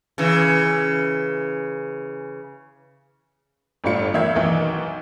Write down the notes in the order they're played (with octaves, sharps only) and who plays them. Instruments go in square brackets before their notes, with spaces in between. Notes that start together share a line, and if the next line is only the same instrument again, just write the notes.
[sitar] C#3 E3
[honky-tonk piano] G1 A2 G3 F4 C#7
D#3 E5 F5 G#6
B1 D#3 E3